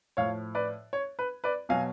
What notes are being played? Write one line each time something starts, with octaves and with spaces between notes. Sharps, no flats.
A2 F3 C#5 F5
B4 D5
C#5
B4
B4 D5
B2 F#3 F5 G#5